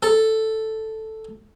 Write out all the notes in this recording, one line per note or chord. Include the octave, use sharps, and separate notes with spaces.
A4